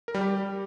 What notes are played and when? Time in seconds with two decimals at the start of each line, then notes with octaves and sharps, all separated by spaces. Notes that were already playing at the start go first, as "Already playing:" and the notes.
0.08 A#4
0.14 G3
0.21 G4